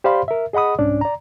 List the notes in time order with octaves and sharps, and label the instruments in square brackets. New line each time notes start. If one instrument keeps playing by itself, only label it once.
[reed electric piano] G4 C5 D5 F5 B5 C6
A#4 E5
G#4 D#5 F#5 B5 D#6
C2 G#2 C#4 D4 D5
D5 A#5